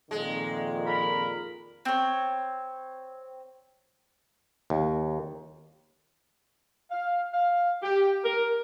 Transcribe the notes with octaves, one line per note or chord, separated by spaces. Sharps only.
F2 A#2 D#3 G#3
A#4 B5
C4 C#5
D#2
F5
F5
G4
A#4